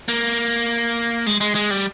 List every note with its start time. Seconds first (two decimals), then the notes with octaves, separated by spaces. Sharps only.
0.08 A#3
1.26 G#3
1.41 G#3
1.55 G#3
1.71 G3